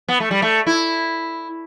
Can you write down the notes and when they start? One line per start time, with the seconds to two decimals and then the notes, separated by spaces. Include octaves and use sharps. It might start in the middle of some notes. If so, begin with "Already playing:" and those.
0.08 B3
0.20 A3
0.31 G3
0.42 A3
0.67 E4